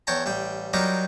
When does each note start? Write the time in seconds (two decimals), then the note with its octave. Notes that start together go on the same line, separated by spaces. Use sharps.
0.07 E2 C#5 G5 A5 A#5
0.26 A1 G3 G5
0.73 F#3 G3 D#4 F4 G4 A#4